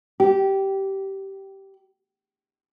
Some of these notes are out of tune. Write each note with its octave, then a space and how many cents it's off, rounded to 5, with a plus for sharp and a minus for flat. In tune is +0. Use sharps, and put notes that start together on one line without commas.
G4 -15